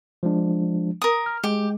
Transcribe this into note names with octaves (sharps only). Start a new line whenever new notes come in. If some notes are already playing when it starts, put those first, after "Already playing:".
F3 G#3 D4
A#4 D#6
F6
G#3 G4